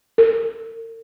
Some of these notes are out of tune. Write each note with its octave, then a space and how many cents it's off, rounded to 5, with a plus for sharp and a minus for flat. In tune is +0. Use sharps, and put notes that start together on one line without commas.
A#4 -45